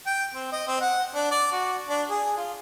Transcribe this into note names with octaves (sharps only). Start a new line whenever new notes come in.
G5
C4
D#5
C4
F#5
D4
D5
F#4
D4
G#4
F4